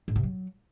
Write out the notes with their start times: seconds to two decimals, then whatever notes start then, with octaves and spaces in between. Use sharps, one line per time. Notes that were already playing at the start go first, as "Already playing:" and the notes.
0.08 G#2
0.16 C3
0.23 F#3